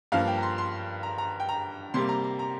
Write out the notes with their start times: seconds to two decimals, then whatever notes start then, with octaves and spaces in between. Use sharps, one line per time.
0.12 G2 F3 A#3 F5
0.28 G5
0.38 A#5
0.43 C6
0.58 C6
1.03 A#5
1.18 A#5
1.40 G5
1.49 A#5
1.94 C3 G3 A#3 C6
2.09 A#5
2.24 A#5
2.39 A#5